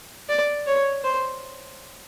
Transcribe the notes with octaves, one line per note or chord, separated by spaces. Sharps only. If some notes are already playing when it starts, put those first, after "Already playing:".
D5
C#5
C5